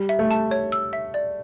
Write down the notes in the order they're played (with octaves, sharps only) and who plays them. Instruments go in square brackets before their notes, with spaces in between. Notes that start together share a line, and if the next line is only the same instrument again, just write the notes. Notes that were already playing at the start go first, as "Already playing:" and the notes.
Already playing: [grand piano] G3
[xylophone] E5
[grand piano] A3
[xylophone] A5
C#5
E6
E5
D5